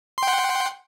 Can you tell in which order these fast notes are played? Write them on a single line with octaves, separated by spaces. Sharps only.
C6 G5 F#5